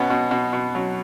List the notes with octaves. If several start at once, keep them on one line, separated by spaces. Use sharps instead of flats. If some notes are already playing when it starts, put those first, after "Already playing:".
Already playing: B2 B3 C#4
B2
B2
B2
F#3